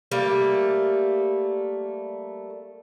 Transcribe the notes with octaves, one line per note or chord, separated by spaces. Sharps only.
G3 A3 A#3